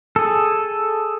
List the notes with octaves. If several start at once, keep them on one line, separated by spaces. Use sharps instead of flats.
G#4 A4